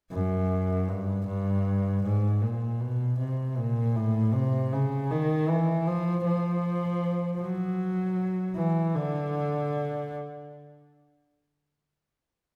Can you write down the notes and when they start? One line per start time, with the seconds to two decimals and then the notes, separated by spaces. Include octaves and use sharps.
0.12 F#2
0.88 G2
1.27 G2
2.03 G#2
2.42 A#2
2.80 B2
3.18 C3
3.57 A#2
3.96 A2
4.34 C3
4.72 C#3
5.11 D#3
5.49 E3
5.87 F3
6.25 F3
7.41 F#3
8.56 E3
8.95 D3